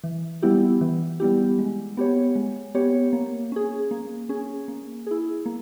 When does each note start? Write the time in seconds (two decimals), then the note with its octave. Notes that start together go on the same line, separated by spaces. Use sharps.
0.04 E3
0.42 G3 B3 E4 G4
0.81 E3
1.20 G3 B3 E4 G4
1.59 G#3
1.97 B3 G4 C#5
2.35 G#3
2.75 B3 G4 C#5
3.13 A#3
3.52 C#4 G#4
3.91 A#3
4.29 C#4 G#4
4.68 A#3
5.07 E4 G#4
5.46 A#3